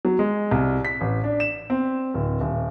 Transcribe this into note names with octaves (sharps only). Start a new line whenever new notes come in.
F#3
G#3
C2
B6
A1
D4
E7
C4
D1
D#1